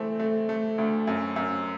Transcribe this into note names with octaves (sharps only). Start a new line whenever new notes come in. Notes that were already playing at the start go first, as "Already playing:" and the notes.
Already playing: E3 A3 C4
A3
A3
D2
F#2
F#2